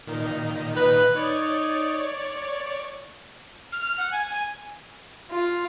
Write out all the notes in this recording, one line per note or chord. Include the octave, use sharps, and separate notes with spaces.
A#2 D#3 D#4
B4
D#4 C#5 D5
F6
F6
F#5
G#5
G#5
F4